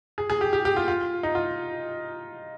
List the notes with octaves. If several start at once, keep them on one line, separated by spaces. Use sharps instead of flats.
G#4
G#4
G4
G4
G4
F4
F4
D#4
F4